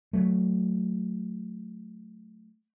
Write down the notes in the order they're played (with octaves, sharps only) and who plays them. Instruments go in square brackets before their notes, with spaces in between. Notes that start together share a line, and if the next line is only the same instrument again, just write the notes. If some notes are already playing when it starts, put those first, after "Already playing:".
[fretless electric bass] F#3 A3